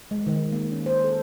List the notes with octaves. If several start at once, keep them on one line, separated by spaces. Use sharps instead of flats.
G#3
D#3
A#3
C#4
C5
A4